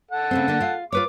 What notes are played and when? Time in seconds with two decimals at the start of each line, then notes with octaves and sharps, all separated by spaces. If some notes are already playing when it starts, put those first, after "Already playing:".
0.11 A4 F#5
0.31 C#3 A3 C4
0.48 D3 A#3 D4
0.60 F4 F5
0.92 F4 B4 C#5 D6